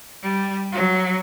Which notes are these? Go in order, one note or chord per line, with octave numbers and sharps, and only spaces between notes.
G3
F#3